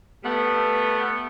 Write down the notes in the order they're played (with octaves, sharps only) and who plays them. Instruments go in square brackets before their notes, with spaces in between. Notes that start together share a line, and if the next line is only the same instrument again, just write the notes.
[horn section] G3 A3 B3